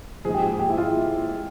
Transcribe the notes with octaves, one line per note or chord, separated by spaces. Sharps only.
G#2 F3 G#4
G4
G#4
G4
E4
F4